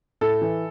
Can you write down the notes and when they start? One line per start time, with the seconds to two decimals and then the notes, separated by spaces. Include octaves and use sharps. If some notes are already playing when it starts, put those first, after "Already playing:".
0.21 A2 A4
0.41 E3